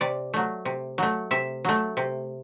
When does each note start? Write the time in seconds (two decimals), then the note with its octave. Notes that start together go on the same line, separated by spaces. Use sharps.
0.01 C3 D5
0.34 F#3 A3
0.65 C3
0.98 F#3 A3
1.31 C3 E5
1.65 F#3 A3
1.97 C3